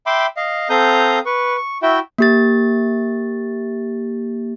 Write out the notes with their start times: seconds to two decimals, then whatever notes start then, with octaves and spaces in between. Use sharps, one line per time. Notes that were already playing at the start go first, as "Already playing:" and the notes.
0.06 E5 G5 B5 C6 D6
0.37 D#5 F5
0.70 C4 A4 F5 A#5 D#6 G6
1.26 B4 C#6
1.58 C#6
1.82 E4 F#4 E5 G5
2.18 A#3 G4 A6